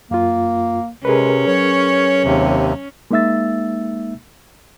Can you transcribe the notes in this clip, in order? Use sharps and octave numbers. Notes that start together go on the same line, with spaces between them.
F#2 A#3 F4
C3 G#3 C#4 G#4 A#4 B4
F#3 C#5
D#2 C3
G#3 A#3 D#4 E5 E6 A6